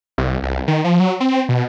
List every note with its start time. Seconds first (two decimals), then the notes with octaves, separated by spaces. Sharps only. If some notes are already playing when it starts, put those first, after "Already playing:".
0.18 C2
0.43 C2
0.68 D#3
0.84 F3
1.00 F#3
1.20 C4
1.49 B2